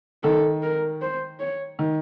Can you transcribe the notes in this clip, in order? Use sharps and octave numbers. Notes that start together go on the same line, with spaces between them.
D#3 A4
A#4
C5
C#5
D#3